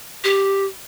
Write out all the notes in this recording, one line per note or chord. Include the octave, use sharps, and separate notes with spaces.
G4